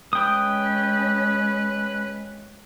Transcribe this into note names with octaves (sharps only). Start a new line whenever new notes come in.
G#3 C#4 B4 G5 D#6